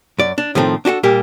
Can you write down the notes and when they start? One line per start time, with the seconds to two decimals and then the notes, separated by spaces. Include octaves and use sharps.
0.19 F#2 D5
0.38 D4
0.55 A2 D#3 F3 A3 C4
0.85 D4 F#4 G4 A4
1.03 A#2 G3 A#3 G4